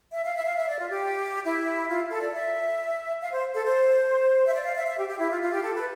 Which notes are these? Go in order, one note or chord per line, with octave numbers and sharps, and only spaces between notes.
E5
F5
E5
F5
E5
D5
F4
G4
E4
F4
A4
D5
E5
F5
C5
A4
C5
E5
D5
F5
E5
E5
G4
G4
E4
F4
F4
G4
A4
B4